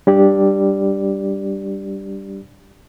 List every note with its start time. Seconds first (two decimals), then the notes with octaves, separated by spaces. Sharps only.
0.07 G3 D4 G4 D5